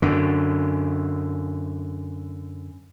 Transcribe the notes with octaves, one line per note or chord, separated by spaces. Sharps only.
F#2 D3